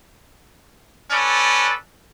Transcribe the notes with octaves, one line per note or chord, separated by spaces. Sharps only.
C#4 A4 B4 D5